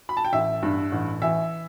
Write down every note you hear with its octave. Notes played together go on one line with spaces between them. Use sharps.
B5
A5
G5
A1 E5
G2
A1
E3 E5